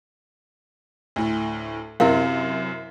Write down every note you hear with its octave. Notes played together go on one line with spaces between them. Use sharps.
D2 A2
F#2 C3 E4 A#4 F5